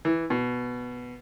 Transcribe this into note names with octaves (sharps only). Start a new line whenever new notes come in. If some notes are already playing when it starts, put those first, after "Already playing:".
E3
B2